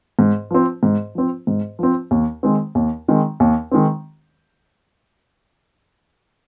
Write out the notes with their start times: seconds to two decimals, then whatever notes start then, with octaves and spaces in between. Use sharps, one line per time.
0.19 G#2
0.51 F3 C4
0.83 G#2
1.15 F3 C4
1.47 G#2
1.79 F3 C4
2.11 D#2
2.43 D#3 G#3 C4
2.75 D#2
3.08 D#3 G#3 C4
3.40 D#2
3.72 D#3 G#3 C4